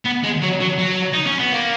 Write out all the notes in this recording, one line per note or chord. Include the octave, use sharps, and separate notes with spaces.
B3
G#3
F#3
F#3
F#3
D#4
C#4
B3
A#3